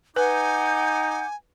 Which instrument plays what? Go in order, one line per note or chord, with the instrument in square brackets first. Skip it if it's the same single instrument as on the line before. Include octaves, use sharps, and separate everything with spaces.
[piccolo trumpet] D#4 [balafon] B4 [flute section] F#5 D6 G6 [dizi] G#5